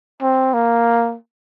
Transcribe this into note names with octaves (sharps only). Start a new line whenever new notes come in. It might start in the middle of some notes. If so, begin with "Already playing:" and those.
C4
A#3